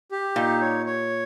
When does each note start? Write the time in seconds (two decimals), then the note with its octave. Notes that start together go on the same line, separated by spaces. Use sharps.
0.12 G4
0.36 A#2 D#4
0.61 C#5
0.86 C#5